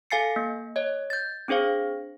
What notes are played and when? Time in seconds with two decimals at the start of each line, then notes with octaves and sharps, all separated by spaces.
0.11 A4 F5 G#5 A6 C7 C#7
0.36 A#3
0.76 C#5 D#5
1.10 G6 A6
1.48 C4 D4 G#4 C5 F5